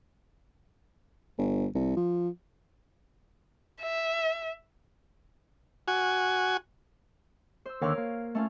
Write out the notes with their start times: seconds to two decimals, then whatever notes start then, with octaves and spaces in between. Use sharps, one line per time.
1.38 G1
1.75 C2
1.97 F3
3.82 E5
5.88 F#4 G#5
7.66 C5 E6
7.82 D#2 D3 A#4 C#5 F5
7.98 A#3
8.35 A3 C#4 F4